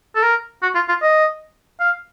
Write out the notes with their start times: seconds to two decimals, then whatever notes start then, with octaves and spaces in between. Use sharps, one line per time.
0.16 A4
0.23 A#4
0.62 F#4
0.75 F4
0.88 F4
1.02 D#5
1.80 F5